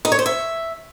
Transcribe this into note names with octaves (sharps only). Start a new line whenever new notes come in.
D#4
C#5
C5
E5